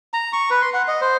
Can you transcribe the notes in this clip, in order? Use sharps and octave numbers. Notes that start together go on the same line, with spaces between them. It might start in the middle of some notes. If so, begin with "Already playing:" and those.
A#5
C#6
B4
C6
F#5
D#5
C5